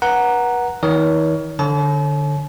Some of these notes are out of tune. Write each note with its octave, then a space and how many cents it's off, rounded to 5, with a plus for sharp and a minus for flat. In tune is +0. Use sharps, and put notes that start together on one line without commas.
B4 -35 F#5 +0 A#5 +0
D#3 +45 C#5 +30
D3 +0 C#5 -25 A5 -45